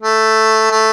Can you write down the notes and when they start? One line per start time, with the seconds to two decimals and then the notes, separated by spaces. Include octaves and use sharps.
0.02 A3
0.71 A3